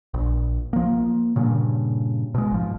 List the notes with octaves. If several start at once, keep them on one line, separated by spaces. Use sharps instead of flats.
A#1
F3 A#3
G2 A#2 C#3
B2 G#3
G#1 F3